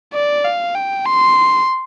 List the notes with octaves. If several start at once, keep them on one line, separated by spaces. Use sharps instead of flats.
D5
F5
G5
C6